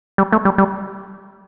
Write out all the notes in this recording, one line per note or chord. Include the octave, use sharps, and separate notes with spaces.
G3
A3
G3
G3